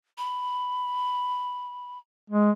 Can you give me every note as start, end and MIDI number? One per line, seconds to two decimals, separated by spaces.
0.18 1.98 83
2.30 2.51 56